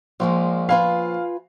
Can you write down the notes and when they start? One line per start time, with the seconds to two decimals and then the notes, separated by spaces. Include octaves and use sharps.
0.20 A#1 G#3 A#3 F4
0.69 F4 B4 F5 G#5